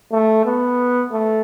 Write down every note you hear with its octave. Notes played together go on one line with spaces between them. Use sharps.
A3
B3
A3